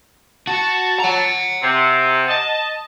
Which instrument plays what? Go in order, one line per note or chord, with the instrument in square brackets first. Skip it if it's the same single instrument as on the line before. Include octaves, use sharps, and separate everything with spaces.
[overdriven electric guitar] F#4 [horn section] A5
[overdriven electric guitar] F#5 A#5
[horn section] C3
D#5 A5